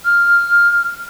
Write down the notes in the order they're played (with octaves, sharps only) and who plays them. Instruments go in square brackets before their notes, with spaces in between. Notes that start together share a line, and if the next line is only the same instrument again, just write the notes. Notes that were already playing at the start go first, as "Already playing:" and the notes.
[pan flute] F6